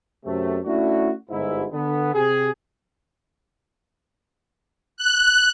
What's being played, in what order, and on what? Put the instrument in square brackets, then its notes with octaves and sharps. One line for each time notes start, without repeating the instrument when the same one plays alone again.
[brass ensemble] F#2 C3 A3
A3 C#4 D4 E4 F#4
G1 G#2 E4
D3 B3
C3 G4 G#4
[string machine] F#6